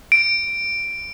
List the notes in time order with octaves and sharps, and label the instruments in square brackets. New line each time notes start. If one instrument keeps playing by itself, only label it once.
[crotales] D7